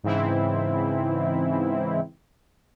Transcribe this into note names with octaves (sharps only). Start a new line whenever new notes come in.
G#2 C#3 E3 C4 E4